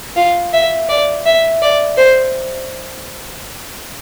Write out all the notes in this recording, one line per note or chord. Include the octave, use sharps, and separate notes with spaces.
F4
E5
D5
E5
D5
C5